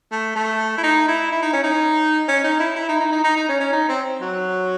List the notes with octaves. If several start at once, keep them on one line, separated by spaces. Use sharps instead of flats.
A3
A3
E4
D#4
E4
E4
D#4
C#4
D#4
C#4
D#4
E4
E4
D#4
D#4
D#4
D#4
D#4
C#4
C#4
D#4
C4
F#3